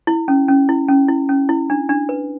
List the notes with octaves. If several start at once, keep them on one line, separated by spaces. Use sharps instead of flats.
E4
C#4
C#4
E4
C#4
E4
C#4
E4
D4
D4
B4